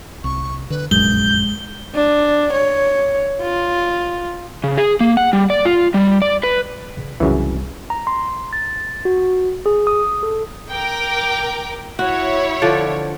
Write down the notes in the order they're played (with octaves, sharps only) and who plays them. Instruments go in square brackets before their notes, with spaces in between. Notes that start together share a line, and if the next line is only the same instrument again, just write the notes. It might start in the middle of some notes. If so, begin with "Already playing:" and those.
[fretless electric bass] C2 [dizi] C#6
[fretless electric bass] D3 [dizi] B4
[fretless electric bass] F1 A#1 F#2 [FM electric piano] G#3 [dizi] G6 [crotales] G7
[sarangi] D4
C#5
F4
[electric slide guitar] C#3
G#4
A#3
F#5
G3
D5
F4
G3
D5
B4
[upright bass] C#3
[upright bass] C2 F4 [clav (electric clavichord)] F#2 C#3 E3
[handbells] A#5
C6
A6
F#4
G#4
D#6
A4
[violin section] A#4 G5 D6
[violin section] E4 C#5 [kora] F#4
[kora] D3 F3 D5